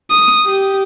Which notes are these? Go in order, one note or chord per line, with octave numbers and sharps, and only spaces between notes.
D#6
G4